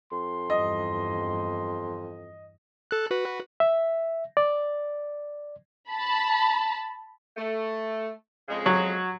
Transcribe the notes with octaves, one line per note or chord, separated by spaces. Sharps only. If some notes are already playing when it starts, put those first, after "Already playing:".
F2 C6
E2 G2 D#5
A4 F#6
F#4 B4
E5
D5
A5 B5
A3
F2 C#3 G#3
F#3 F#4